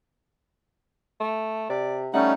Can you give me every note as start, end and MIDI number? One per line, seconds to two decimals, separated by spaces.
1.20 1.66 57
1.70 2.14 48
1.70 1.99 74
2.13 2.34 55
2.13 2.34 57
2.13 2.32 61
2.13 2.34 63
2.13 2.33 78